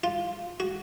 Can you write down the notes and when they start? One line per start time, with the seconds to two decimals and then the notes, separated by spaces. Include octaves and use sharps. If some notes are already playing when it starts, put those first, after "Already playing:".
0.04 F4
0.60 F#4